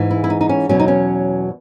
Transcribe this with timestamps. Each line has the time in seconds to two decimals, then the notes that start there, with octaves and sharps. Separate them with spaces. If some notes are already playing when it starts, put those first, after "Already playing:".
Already playing: G#2 E3 G#3
0.11 E4
0.24 E4
0.30 D#4
0.41 D#4
0.49 C#4
0.69 E2 B2 F#3 C#4
0.80 D#4
0.88 C#4